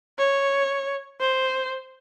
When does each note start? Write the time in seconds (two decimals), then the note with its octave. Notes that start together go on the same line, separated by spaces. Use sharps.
0.19 C#5
1.21 C5